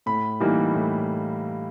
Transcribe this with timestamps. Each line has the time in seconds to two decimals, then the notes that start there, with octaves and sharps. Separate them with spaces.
0.06 A2 B5
0.40 E3 G3 A#3 D#4
0.75 A2